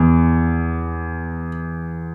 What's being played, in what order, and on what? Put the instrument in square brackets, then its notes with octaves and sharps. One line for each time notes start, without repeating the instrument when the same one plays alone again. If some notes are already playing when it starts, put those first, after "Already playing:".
Already playing: [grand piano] E2